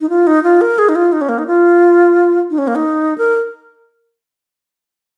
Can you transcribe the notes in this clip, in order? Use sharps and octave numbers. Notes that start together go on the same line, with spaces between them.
D#4
F4
D#4
F4
A#4
G#4
D#4
F4
D#4
C#4
A#3
D#4
F4
D#4
C#4
A#3
D#4
A#4